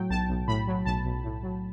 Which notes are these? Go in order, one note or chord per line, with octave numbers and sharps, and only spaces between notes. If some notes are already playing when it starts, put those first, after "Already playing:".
Already playing: A2 F#3 G5
B1 A5
B1
A2 B5
F#3
B1 A5
B1
A2
F#3